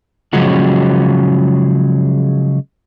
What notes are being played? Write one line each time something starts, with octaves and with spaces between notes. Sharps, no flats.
C#3 F3 F#3 G#3 C#4 F#4